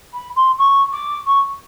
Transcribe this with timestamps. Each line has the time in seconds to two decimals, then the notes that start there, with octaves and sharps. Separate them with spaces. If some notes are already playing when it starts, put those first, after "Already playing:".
0.14 B5
0.36 C6
0.58 C#6
0.93 D6
1.26 C#6